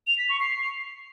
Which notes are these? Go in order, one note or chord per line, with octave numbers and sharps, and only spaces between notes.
F7
B6
C#6
C7